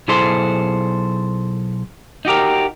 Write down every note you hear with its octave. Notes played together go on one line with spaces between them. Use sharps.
B1 E4 G#4 A4 C5 C6
D#4 F#4 G4 A#4